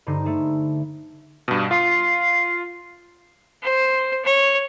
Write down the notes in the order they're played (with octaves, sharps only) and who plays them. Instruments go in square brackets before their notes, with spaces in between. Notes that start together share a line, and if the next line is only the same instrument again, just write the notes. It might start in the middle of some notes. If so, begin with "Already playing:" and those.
[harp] G2 D3 D#4 C5
A3 G#4 A5
[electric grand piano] G2 B2
[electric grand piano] F4 C6 [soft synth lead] C7
[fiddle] C5
C#5